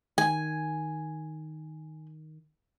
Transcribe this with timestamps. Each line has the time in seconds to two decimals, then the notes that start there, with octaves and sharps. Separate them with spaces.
0.18 D#3 G#5